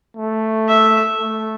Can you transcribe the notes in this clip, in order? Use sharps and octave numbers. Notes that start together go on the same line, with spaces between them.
A3
E5
A3